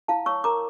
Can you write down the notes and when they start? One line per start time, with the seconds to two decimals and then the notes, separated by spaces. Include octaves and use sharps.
0.08 E4 F5 A5
0.26 C#5 C#6 E6
0.44 A#4 A#5 D6